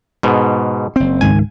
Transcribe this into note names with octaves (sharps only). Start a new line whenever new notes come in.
G#2 B2
F#1 C4
C#2 G#2 D#3 G#5